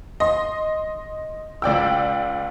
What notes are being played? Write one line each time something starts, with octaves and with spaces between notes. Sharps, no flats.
D#5 C6
C#2 D5 G5 E6